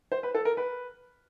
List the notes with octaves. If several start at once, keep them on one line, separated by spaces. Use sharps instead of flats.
C5
B4
A4
A#4
B4